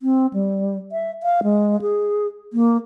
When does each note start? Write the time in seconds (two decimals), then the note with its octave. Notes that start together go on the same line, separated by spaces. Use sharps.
0.02 C4
0.33 G3
0.92 E5
1.23 F5
1.44 G#3
1.82 G#4
2.53 A#3